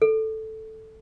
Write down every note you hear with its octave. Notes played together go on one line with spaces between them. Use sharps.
A4